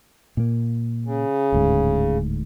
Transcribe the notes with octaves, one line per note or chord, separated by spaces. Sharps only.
A#2 A#3
C#3
D1 D2 G#2